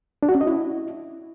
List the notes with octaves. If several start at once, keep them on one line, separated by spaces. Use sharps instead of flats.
D4
F#4
C#4
D#5
E4